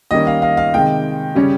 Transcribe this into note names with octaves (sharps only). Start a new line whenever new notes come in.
D#3 G3 A#3 C#4 D#5
F5
F5
F5
C3 D#3 G#3 G5
C#3 G3 C#4